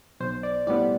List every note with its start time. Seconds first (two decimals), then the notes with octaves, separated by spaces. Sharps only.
0.20 B1 C5
0.43 D5
0.67 A2 G3 B3 D5